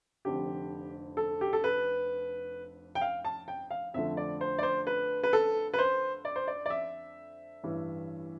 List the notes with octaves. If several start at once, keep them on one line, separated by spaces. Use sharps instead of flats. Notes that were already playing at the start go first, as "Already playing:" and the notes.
F1 F2 D3 G4
A4
G4
A4
B4
G5
F5
A5
G5
F5
F2 D3 F3 A3 E5
D5
C5
D5
C5
B4
B4
A4
B4
C5
D5
C5
D5
D5
E5
A1 G2 E3